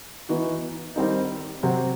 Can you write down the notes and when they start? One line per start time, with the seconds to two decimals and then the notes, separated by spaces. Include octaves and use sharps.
0.29 E3 B3 D#4 F#4
0.96 D#3 G3 C4 D#4
1.63 C3 F#3 C4